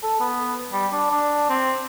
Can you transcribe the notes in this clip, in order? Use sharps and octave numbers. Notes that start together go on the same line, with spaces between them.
A4
B3
G3
D4
D4
C4